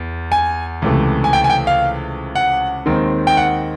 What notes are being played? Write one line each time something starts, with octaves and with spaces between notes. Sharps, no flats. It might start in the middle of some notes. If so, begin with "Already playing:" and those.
Already playing: E2
G#5
C#2 C3 E3 A3
G#5
G5
G#5
G5
F5
F#5
D#2 D#3 G#3 C4 D#4
G5
F#5